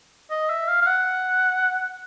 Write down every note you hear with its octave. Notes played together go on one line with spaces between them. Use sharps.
D#5
E5
F5
F5
F#5